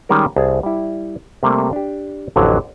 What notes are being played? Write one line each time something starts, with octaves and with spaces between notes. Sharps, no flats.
D#3 G3 G#3 C#4 A#4
C2 G#4 A5
G3 E4
C3 G3 A3 A#3 C4
D4 G4
A1 F2 D3 F#3